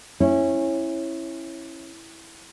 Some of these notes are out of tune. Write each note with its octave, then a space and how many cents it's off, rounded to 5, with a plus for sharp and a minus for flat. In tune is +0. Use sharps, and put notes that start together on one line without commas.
C#4 -25 E4 +0